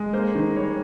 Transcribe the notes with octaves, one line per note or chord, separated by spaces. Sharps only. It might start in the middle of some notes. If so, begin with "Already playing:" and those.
Already playing: G#3
A#3 C5
D#3
G3 C#5